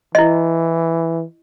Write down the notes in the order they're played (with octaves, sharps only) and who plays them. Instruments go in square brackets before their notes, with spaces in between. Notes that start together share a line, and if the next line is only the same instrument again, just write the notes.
[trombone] E3 [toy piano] E4 D#5